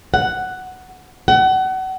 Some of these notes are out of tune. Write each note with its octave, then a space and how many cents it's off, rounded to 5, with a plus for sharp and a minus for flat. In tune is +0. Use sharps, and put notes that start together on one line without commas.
F#5 +5
F#5 +30